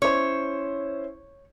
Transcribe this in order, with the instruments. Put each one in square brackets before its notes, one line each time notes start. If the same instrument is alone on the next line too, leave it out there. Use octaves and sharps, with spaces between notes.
[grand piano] C#4 E4 C5 [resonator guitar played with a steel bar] C#5